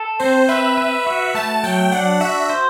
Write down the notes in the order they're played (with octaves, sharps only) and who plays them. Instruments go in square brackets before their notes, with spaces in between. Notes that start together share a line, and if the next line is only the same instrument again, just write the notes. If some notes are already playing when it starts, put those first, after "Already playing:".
Already playing: [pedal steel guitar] A4
[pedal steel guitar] C4 [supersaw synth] C5
[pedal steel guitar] B4 [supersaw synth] E5
[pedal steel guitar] B4
F#4
[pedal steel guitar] A3 [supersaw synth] A5
[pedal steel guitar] F#3 [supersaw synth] G5
[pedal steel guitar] D4 [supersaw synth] F#5
[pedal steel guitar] F#4 [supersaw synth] E5
[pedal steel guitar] C5